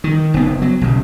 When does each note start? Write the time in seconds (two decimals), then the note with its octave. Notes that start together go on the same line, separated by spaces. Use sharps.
0.04 D#3
0.34 F#1 B3
0.62 F#3
0.81 B1 C#3